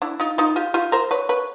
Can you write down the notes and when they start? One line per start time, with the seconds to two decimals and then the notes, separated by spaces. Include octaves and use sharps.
0.02 D4 E4
0.20 D#4 F4
0.38 D#4 F4
0.56 F4 G4
0.74 F4 G4
0.92 A#4 C5
1.11 B4 C#5
1.29 B4 C#5